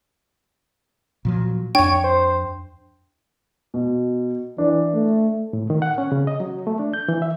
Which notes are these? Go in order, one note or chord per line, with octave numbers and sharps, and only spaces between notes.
A#2 F3 F#3
F2 D4 C#5 G5
C5
B2
E3 D4
A3
A2
D#3
F#5
C#4
C#3
D#5
F#3
A3
D4
G6
E3
E5